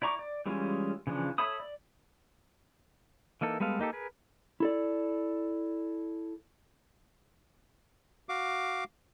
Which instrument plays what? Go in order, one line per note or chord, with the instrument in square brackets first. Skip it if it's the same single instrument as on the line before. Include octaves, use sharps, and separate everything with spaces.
[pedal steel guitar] E4 D5 A#5 C#6 D6
D5
E3 G3 G#3 C#4 F4
C#3 E3 F3 D4
A4 C#5 E5 B5 D#6
D5
E3 A#3 D#4 A4
G3 G#3 B3 A4 F5
A#3 D#4 G4 A4
G#4 A#4 B4
[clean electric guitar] E4 A4 D5
[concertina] F#4 F5 D6